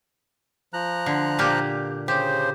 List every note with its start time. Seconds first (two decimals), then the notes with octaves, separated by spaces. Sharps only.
0.73 F3 A#5 F#6
1.06 D3
1.39 A#2 A#3 G4
2.08 C#3 G4 C5